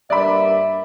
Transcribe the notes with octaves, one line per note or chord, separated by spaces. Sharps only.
G2 A#3 D5 E5 B5